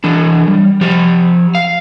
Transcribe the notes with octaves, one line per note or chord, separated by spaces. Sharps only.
E3 D4
G3
F3 G4
F5